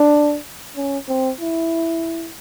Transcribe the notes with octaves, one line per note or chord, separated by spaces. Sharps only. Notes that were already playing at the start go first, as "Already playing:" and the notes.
Already playing: D4
C#4
C4
E4